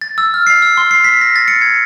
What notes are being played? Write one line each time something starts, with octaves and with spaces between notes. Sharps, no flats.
A6
E6
F6
C7
E6
C6
C7
B6
A#6
A6
C#7
G#6